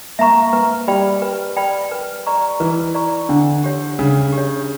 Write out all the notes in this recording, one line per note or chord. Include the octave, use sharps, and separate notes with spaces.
A#3 E5 A#5 C#6
A#3 B4
G3 D5 G5 B5
B4
D5 G5 B5
B4
D5 A#5 C#6
E3 B4
D5 A#5 C#6
D3 D4
G4 C#5
C#3 D4
G4
C#5